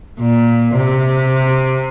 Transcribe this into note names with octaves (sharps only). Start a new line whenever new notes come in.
A#2
C3